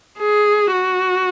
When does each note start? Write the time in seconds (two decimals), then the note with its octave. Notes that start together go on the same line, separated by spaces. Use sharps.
0.18 G#4
0.72 F#4